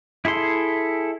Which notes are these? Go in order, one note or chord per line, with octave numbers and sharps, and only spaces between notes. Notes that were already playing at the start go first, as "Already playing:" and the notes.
E4 G#4 A4 C6